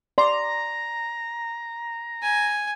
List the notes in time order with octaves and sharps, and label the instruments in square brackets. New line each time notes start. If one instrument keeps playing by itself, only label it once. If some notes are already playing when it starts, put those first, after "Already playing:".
[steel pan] D5 C6 [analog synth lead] A#5
[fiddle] G#5